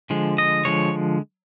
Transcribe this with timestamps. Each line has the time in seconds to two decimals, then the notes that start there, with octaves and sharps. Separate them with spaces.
0.10 D3 F3 G#3
0.38 D#5
0.65 D3 F3 G#3 C#5